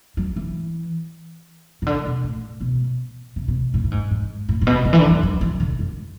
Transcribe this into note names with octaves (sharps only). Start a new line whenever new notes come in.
F#3
E3
C#3
D3
B2
A2
B2
C#3
B2
A2
A2
G#2
G#2
A2
A2
B2
C#3
E3
D3
F#3
F#3
E3
D3
F#2